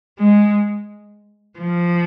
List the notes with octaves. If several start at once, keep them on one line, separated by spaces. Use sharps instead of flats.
G#3
F3